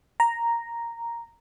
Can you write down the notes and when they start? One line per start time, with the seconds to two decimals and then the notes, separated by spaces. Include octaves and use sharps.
0.20 A#5